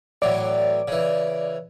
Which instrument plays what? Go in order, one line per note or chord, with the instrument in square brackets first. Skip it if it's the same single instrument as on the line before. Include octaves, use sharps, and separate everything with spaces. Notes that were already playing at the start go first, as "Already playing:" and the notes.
[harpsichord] A2 E3 F#3 [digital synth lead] D5
[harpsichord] C#3 E3